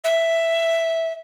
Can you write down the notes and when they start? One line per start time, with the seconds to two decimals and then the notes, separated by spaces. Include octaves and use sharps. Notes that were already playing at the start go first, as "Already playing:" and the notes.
0.04 E5